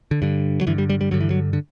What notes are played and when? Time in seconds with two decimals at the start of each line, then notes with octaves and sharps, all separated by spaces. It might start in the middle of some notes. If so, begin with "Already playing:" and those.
0.11 D3
0.22 G2 D3
0.61 F#3
0.67 G2 D3 E3
0.78 G3
0.90 G3
1.01 G3
1.11 G2 D3 F#3
1.21 E3
1.30 F#3
1.53 D3